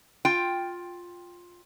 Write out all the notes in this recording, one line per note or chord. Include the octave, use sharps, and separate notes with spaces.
F4 G5